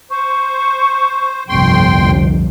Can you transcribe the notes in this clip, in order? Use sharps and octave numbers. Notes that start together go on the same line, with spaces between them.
C5 C#6
G1 C2 F2 G5 C6